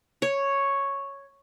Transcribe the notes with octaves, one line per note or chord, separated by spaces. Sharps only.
C#5